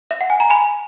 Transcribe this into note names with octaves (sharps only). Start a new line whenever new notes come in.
E5
F#5
G#5
A#5
G#5 B5